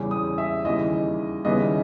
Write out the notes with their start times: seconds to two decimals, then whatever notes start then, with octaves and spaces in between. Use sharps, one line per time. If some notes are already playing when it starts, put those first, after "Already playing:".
Already playing: E2 C#3 G3 C#4
0.11 D#6
0.38 E5
0.64 D#2 C#3 E3 G3 D#5
1.45 D#2 C#3 G3 B3 E4 D#5